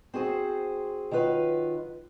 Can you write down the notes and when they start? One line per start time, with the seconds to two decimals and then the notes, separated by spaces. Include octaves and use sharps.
0.14 C4 F#4 G#4 C5
1.11 D#3 F#3 F4 B4